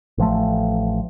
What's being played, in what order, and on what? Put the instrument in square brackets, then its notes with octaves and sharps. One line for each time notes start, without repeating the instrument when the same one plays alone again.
[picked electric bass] A1 F3 A3